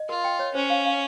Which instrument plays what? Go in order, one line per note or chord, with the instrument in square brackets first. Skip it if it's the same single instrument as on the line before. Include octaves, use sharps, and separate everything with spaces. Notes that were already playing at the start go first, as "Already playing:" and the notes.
Already playing: [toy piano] D#5
[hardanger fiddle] F4 [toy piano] A#4
[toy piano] G5
C#5
[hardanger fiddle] C#4 [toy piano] C5
[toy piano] F5
F5